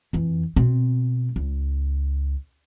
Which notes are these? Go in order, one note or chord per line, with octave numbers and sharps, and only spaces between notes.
F2 E3
B2 C4
C#2